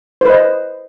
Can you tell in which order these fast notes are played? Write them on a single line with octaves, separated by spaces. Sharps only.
C5 B4 D#5